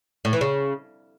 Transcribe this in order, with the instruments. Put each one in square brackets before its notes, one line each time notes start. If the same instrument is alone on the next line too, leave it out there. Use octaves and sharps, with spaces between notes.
[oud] A2
E3
C#3